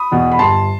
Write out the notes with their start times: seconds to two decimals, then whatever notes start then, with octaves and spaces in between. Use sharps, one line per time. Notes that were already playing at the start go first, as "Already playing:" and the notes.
Already playing: B5 D#6
0.11 E2 B2
0.32 B5
0.39 G1 A5 C6